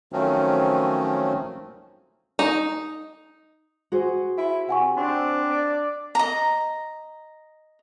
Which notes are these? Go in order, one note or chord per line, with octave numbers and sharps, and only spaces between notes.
D#3 F3 F#3 A3 C4 C#4
D#4
F#4 G#4 C5
E4
C3 F#5 G#5 C#6
C4 D4
D5
D#5 A#5